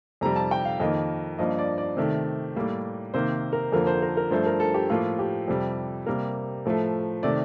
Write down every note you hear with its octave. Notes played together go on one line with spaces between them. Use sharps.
F2 C3 G3 A#5
A5
G5
F5
F2 D#3 A#3 D#5
G2 F3 A#3 D#5
D5
D5
C3 D#3 A3
A2 G3 A#3
C3 D#3 A#3 C5
A#4
F2 D3 F3 A#3 A#4
C5
A#4
A#4
G2 F3 A3 C5
A#4
A4
G4
A2 F3 A#3 F4
G4
F2 C3 G3
C3 G3 A#3 A#4
A2 F3 A3
C3 D#3 A3 D5